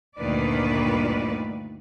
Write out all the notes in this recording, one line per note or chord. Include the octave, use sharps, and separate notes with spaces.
D2 G2 A#2 D#3 B4 D5